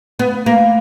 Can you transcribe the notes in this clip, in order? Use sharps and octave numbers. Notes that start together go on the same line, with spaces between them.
B3
A#3